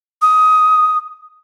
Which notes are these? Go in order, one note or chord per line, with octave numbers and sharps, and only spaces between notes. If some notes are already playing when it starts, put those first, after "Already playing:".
D#6